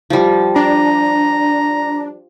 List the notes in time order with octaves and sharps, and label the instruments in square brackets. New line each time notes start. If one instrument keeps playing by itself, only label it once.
[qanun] F3 G3
[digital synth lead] D4 [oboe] A#5